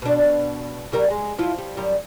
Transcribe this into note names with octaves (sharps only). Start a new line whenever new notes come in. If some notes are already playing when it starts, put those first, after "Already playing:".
B2 D4
C#3 G3 A#4
G#3
F3 E4 F4
G3
F#2 G3